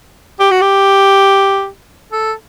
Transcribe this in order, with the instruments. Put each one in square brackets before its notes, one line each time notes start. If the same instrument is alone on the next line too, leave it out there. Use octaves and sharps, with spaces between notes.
[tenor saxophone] G4
F#4
G4
A4